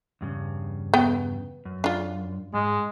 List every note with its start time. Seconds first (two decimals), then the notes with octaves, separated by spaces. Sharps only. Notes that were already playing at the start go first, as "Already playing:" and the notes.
0.21 E2 G2 C#3
0.94 B3 G5
1.65 F#2
1.84 D4 F4
2.54 G#2 G#3